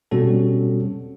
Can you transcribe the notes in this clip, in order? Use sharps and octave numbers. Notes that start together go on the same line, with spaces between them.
B2 G3 C4 C#4 F#4 A4